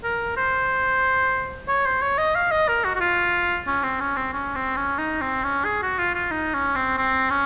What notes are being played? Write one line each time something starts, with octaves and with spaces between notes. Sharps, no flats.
A#4
C5
C#5
C5
C#5
D#5
F5
D#5
A#4
F#4
F#4
F4
C#4
C4
C#4
C4
C#4
C4
C#4
D#4
C4
C#4
G#4
F#4
F4
F4
D#4
C#4
C4
C4
C#4